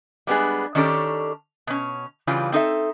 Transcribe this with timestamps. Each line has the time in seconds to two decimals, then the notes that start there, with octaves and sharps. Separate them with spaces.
0.27 G3 G#3 B3 D4 G#4
0.75 D#3 C#4 D4 G4 A4
1.67 B2 C#4
2.27 C#3 E3 G3 F4
2.52 C4 D#4 A4 E5